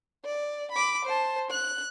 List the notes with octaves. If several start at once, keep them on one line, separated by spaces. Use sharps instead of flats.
D5
B5 D6
C5 A5
F#6